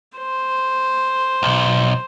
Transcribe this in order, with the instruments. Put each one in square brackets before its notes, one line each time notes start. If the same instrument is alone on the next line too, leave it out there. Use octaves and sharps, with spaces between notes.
[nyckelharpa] C5
[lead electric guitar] B1